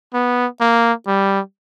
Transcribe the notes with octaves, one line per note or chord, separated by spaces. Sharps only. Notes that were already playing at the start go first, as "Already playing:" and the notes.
B3
A#3
G3